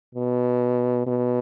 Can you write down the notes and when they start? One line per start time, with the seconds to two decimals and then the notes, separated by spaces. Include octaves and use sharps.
0.14 B2
1.07 B2